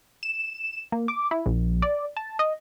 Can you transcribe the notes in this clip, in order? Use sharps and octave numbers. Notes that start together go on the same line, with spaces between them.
E7
A#3
D6
E4
A#1
D5
A5
D#5